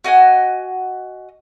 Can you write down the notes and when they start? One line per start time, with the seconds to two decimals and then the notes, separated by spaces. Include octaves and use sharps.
0.04 F#4 D#5 F#5 G#5